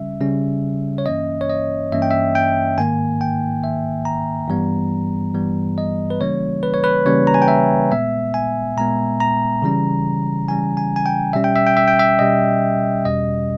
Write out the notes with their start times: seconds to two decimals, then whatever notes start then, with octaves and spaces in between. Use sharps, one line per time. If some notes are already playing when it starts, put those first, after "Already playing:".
Already playing: C#3 G3 C#4 E5
0.21 C#3 G3 C#4
0.98 C#5
1.06 G2 E3 A#3 C#4 D#5
1.41 C#5
1.50 D#5
1.92 G2 E3 A#3 C#4 E5
2.02 G5
2.11 E5
2.35 G5
2.78 G#2 D#3 A#3 G#5
3.21 G5
3.64 G#2 D#3 A#3 E5
4.05 A#5
4.48 G2 E3 G3 B3
5.34 G2 E3 G3 B3
5.78 D#5
6.10 B4
6.20 C#3 E3 G3 A#3 C#4 C#5
6.63 B4
6.74 C#5
6.84 B4
7.06 C#3 E3 G3 A#3 C#4 C#5
7.27 A#5
7.34 G#5
7.42 G5
7.48 E5
7.91 A#2 G#3 B3 E5
8.34 G#5
8.77 A#2 G#3 B3 A#5
9.20 A#5
9.62 C#3 E3 G3 C#4
10.48 C#3 E3 G3 C#4 G#5
10.77 G#5
10.96 G#5
11.06 G5
11.33 B2 G3 C#4 E5
11.44 G5
11.56 E5
11.67 G5
11.77 E5
11.88 G5
11.99 E5
12.19 B2 G3 C#4 D#5
13.05 E2 B2 G3 C#4 D#5